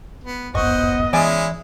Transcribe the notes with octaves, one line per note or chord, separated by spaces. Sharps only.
B3
D1 G1 F#2 B3 C5 D#5 F#5 C#6
E3 G#3 C#4 E4 D5 E5 G#5